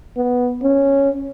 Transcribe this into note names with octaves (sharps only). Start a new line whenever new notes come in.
B3
C#4